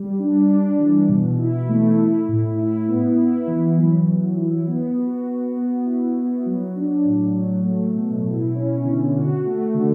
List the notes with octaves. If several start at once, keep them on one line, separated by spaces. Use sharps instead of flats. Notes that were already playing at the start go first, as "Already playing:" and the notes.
Already playing: G3
D4
D4
E3
B2
E4
A3
E4
A2
E4
B3
E4
E3
F#3
F#3
E4
B3
F#4
F#4
B3
E4
B3
F#3
D4
A2
F#3
A3
B2
E4
C#4
D3
F#4
A3
D3